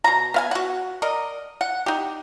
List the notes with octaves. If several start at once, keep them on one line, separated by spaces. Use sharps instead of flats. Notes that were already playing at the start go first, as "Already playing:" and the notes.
B2 A#5
B3 F5 G#5
F#4 F#5
A#4 D5 D#5
F#5
D#4 G4